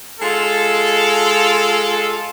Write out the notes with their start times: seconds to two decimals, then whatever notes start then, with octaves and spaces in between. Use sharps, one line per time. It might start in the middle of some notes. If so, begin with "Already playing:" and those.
0.20 G#3 F4 A4